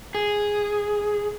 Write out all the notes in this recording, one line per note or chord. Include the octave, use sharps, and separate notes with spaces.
G#4